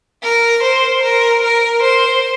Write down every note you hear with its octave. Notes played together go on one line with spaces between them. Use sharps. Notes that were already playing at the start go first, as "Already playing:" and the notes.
A#4
C5
A#4
A#4
C5